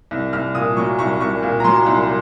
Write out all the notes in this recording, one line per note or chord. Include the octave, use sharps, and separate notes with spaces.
C2
C2 F6
A#2 D#6
F#3 C#6
C2 C#6
C2 C#6
A#2
A#5
F#3 C6
C2